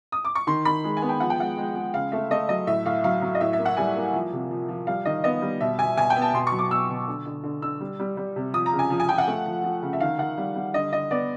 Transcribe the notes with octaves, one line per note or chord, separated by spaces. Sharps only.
D#6
D6
C#6
D#3 C6
D#3 B5
G#3
G#5
B3
G5
F3 F#5
G5
G#3 F#5
G#3
G#3
C#3 F5
A3 E5
A3 D#5
F#3 D#5
A2 E5
A2 F5
F#3 F5
F#3
D#5
A2 E5
E5
A#3
F#5
G3 G#5
A#3
F3
C3
F3
F3
G3 F5
D#3 D#5
B3 D#5
G3
B2 E5
B2 G#5
B2 G#5
G5
B3
A5
B2 C6
C#6
F#3
D6
B2 E6
B2
D3
D3
D3
D3 E6
G3
G3
G3
C3
F3 D#6
A#5
C#3
G#5
F3
G#5
F3 G5
F#5
A3
F3
F3
C#3
E5
D#3 F5
D#3 F#5
G3
G3
D3 D#5
D3 D#5
B3 D5